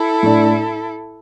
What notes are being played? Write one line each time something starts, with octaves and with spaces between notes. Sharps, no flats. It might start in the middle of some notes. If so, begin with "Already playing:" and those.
Already playing: E4 A4
A2 A3 D4